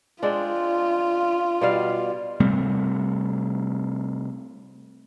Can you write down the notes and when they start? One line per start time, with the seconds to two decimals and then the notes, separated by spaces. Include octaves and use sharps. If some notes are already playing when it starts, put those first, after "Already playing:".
0.22 G#3 C4 D4 F4
1.61 B2 G3 F5
2.40 C3 G3 A3 C4